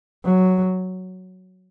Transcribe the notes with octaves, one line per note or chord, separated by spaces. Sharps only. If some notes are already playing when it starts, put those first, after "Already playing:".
F#3